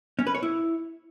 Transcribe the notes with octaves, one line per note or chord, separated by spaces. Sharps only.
C#4
B4
C#5
E4